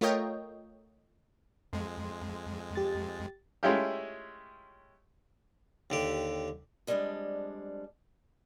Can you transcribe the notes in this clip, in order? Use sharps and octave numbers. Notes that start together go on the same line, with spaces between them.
A3 F4 A#4 C#5 D#5 G5
F2 G#3 C6
G4 A6
G#3 A3 C#4 E4 F4 G4
D#2 D3 G4
F2 G3 G#3 C#4 D4